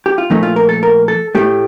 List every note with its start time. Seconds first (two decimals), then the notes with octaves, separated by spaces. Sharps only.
0.06 G4
0.18 F4
0.30 A#2 F3 A3 D#4
0.43 F4
0.56 A#4
0.69 A4
0.83 A#4
1.08 A4
1.35 A2 A3 G4